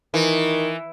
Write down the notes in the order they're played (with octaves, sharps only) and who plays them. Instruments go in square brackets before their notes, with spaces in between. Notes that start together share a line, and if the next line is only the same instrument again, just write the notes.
[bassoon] D#3 [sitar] E3